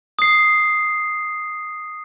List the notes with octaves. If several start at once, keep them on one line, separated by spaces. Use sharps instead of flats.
D#6 C7